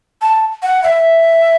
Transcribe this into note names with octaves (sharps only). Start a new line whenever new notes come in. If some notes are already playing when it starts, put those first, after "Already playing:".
A5
F#5
E5